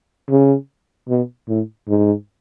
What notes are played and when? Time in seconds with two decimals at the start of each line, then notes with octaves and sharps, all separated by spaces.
0.30 C#3
1.08 B2
1.48 A2
1.88 G#2